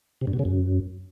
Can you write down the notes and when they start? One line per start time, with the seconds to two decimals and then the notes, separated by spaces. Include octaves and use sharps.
0.21 C3
0.27 G2
0.33 B2
0.39 C#3
0.45 F#2